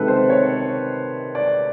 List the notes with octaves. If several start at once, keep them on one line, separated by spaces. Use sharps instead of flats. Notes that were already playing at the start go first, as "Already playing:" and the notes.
Already playing: C#2 C3 D#3 A4 B4
C5
C#5
D5